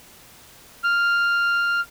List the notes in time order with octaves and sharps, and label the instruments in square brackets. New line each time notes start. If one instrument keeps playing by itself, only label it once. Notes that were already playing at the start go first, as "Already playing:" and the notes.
[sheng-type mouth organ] F6